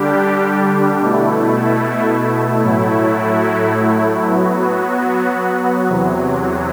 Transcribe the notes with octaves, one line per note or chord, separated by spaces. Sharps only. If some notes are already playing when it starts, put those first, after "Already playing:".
Already playing: D3 G3 D4 G4
B2 A3 E4
A2 F#3 A3 E4
F#3 B3 F#4
E2 C3 F#3